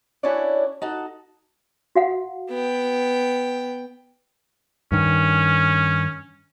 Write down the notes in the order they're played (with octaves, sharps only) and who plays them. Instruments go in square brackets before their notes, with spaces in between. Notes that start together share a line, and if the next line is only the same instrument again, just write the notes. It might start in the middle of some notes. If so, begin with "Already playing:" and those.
[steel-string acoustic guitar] C#4 D4 E4 F#4 C#5 D5
D#4 F#4 A4
[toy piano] F#4 F5 F#5
[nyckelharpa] B3 G5
[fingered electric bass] G2 D#3 [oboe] C#4